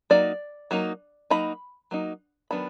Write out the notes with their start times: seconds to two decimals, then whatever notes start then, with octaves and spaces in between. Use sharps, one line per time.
0.10 F#3 A#3 D#4 D5
0.71 F#3 A#3 D#4
1.30 F#3 A#3 D#4 B5
1.91 F#3 A#3 D#4
2.51 D#3 F#3 B3 D4 B5